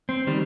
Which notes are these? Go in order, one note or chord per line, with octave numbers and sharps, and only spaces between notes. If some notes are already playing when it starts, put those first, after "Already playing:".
C4
D#3 G3